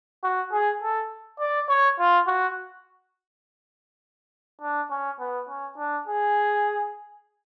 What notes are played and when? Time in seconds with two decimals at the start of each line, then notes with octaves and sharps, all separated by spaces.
0.23 F#4
0.52 G#4
0.82 A4
1.39 D5
1.69 C#5
1.99 F4
2.27 F#4
4.61 D4
4.90 C#4
5.20 B3
5.49 C#4
5.77 D4
6.07 G#4